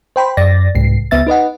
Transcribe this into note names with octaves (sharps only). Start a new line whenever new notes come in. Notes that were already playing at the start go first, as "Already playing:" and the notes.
C5 G5 B5 C6
F#2 D5 A6 A#6
C2 G#2 C7
C#2 B3 E5 A6
D#4 B4 D#5 F#5